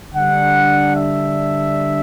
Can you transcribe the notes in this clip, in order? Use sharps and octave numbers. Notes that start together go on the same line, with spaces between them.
D3 G3 D4 F#5
E5